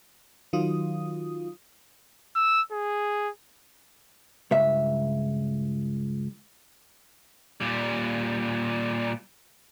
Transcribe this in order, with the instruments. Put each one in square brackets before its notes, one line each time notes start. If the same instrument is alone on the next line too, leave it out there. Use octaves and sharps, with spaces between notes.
[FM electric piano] D#3 F#3 F4 D#6
[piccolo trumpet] E6
G#4
[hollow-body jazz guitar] C#2 G2 E5
[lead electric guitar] A#2 G3